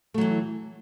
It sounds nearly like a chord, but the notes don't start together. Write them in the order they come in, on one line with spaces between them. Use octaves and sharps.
A3 F#3 E3